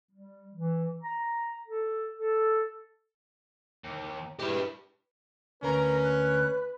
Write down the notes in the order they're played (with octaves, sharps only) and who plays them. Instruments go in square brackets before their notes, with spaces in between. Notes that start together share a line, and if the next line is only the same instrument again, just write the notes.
[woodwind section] G3
E3
A#5
A4
A4
[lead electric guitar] D#2
[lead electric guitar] G#3 E4 [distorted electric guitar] G4 B4
[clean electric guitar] D2 A#3 [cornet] C#4 [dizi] A#4 [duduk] B4
[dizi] F#6